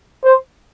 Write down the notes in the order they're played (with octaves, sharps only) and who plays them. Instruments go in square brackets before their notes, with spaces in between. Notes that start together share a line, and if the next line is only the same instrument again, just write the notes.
[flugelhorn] C5